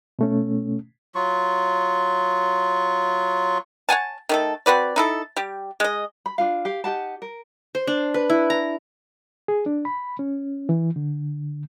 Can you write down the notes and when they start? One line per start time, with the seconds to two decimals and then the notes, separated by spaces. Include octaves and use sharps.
0.19 B2 A3 C#4
1.15 F#3 F4 C#6
3.89 C#5 F#5 G#5 A5
4.29 D#3 A3 A4
4.66 C4 F#4 B4 D5
4.96 D#4 E4 A4
5.37 G3 G4
5.80 G#3 D#5
6.26 B5
6.38 D4 F4 F5
6.65 G4 F5
6.84 D#4 G4 F#5 A5
7.22 A#4
7.75 C5
7.87 D4
8.14 B4
8.30 E4
8.50 A#5
9.48 G#4
9.66 D4
9.85 B5
10.19 C#4
10.69 E3
10.96 D3